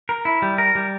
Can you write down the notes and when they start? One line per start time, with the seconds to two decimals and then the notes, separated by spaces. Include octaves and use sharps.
0.09 A#4
0.25 E4
0.42 G3
0.58 A#4
0.75 G3